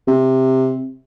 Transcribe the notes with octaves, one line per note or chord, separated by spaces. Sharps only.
C3